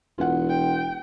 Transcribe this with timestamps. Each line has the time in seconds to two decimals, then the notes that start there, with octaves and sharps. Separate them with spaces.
0.18 E1 F4 F#5
0.49 G5